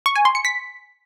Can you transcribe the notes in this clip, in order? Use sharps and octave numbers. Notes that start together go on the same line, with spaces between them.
C#6
G#5
C6
C#7
B6